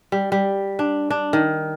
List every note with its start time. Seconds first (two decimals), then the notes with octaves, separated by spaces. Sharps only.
0.12 G3
0.32 G3
0.79 D4
1.10 D4
1.33 D#3